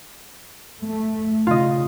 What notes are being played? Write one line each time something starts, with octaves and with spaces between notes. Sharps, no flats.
A3
C#3 F4 D#5